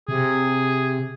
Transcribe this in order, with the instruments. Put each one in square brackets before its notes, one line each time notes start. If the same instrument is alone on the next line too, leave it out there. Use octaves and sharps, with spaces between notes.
[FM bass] C3 [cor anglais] G#4